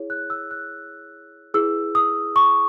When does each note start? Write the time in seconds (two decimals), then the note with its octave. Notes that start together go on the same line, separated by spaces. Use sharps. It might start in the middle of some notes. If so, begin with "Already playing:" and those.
Already playing: E4 G#4 C#5
0.10 F#6
0.30 E6
0.51 F#6
1.54 E4 G#4 B4 E6
1.95 D#6
2.36 C#6